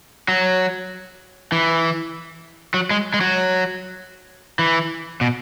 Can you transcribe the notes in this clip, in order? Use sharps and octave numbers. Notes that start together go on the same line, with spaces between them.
F#3
E3
F#3
G#3
G#3
F#3
E3
B2